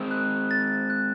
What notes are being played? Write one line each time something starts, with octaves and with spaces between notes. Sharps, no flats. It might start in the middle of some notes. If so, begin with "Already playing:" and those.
Already playing: G#3 C4
F#6
A6
F#6